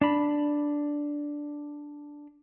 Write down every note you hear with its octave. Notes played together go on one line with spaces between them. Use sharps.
D4 B5